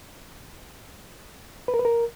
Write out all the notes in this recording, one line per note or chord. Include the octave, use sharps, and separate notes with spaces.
B4
A#4
B4
A#4